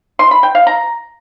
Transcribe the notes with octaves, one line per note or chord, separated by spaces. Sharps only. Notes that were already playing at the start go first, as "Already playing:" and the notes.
C6
B5
G5
F5
A#5